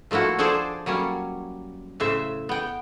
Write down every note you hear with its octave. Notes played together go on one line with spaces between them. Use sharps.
F3 A3 A#3 E4 F#4
F3 D4 G#4 A4 C5 D5
F#3 G3 A#3 C#4
A2 C#3 C5 E5
B3 G5